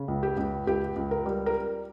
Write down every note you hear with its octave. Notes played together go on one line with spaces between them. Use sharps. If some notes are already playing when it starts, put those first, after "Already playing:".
Already playing: C#3
C#2
G4
C#2
C#2 G4
C#2
A#4
G3
A#4